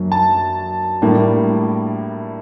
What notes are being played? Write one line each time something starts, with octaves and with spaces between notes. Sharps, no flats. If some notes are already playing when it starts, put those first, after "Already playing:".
Already playing: F#2 F#3 A#3 D4
A5
A2 G3 A#3 D4